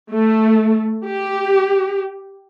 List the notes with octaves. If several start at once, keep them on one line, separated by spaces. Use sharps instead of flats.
A3
G4